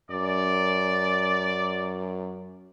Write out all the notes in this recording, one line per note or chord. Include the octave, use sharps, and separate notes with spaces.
F#2 D5